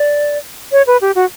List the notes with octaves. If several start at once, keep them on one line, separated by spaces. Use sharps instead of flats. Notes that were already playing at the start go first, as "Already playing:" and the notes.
Already playing: D5
C#5
B4
G4
F#4